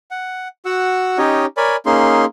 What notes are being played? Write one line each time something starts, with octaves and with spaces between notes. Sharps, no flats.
F#5
F#4 F#5 E6
C#4 D#4 G4 C#5 D#5
A#4 C#5 D5 G#5 B5
A#3 C#4 D#4 G#4 C6